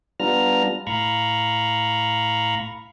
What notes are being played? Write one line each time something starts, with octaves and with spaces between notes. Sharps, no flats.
G3 B3 D4 F4 A#5 F6
A2 F5 A#5 B5 C#6